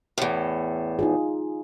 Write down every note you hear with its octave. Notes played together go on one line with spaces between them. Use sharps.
E2 A2
D#4 F4 G#4